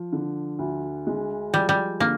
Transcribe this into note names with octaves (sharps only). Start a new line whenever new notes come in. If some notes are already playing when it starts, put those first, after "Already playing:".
Already playing: F3
D3
D2
G#3
F3 G3
G3
D3 A#3